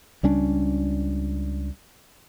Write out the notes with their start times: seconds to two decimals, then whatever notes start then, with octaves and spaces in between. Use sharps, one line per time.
0.23 C#2 G3 C#4 D4